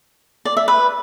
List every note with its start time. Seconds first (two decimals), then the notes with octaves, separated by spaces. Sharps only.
0.45 D5
0.57 E5
0.68 B4